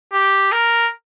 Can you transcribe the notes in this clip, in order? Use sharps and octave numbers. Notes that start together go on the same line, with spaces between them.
G4
A#4